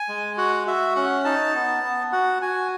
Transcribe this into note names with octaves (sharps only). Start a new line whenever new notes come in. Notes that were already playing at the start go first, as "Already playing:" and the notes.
Already playing: G#5
G#3
F#4 F#5
F#4 E5
C#4 F#5
D#4 A5
B3
B3
F#4 F#5
F#4 G#5